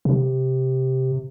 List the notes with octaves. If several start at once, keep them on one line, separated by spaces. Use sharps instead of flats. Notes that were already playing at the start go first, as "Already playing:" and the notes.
C3